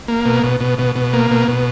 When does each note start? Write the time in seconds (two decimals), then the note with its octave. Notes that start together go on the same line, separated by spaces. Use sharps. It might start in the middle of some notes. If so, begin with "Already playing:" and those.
0.08 A#3
0.25 B2
0.43 B2
0.60 B2
0.79 B2
0.96 B2
1.13 A#3
1.31 B2
1.48 B2